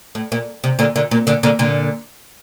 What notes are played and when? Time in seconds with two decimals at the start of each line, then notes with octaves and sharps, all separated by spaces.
0.15 A2
0.32 A#2
0.64 C3
0.79 A#2 D3
0.96 A#2 D3
1.11 A#2
1.27 A#2 D3
1.43 A#2 D3
1.59 A#2 D3